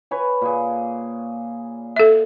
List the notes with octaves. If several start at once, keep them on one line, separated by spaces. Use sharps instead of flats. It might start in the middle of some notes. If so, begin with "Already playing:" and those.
B4 C#5 G#5
A#2 G#4
A4 E5